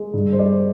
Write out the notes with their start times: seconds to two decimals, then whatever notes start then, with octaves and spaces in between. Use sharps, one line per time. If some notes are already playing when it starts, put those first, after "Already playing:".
Already playing: G#3
0.14 G2
0.33 C5
0.39 G3 D5